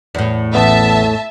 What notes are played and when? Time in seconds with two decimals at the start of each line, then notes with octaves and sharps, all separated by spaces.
0.15 E2 A2
0.55 A1 B3 E5 A5